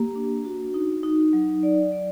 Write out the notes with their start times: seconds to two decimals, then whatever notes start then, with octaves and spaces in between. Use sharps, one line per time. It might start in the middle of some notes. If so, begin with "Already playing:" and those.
Already playing: A#3 G4
0.16 D4
0.45 F#4
0.74 D#4
1.03 D#4
1.33 F#3
1.63 D5
1.92 D5